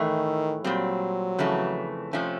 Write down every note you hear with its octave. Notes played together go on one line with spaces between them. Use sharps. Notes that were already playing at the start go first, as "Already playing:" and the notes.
Already playing: A2 D#3 E3 A3
A#2 F#3 G3 C4
F2 C#3 E3 A3
C3 F3 A3 C#4